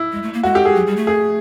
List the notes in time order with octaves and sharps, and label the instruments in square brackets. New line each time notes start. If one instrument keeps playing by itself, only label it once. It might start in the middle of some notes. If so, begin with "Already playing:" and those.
Already playing: [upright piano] E4
[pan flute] G#3
A3
A#3
[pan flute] G#3 [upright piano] F#4
[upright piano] G4
G#4
[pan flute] F#3
G3
A3
[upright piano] G#4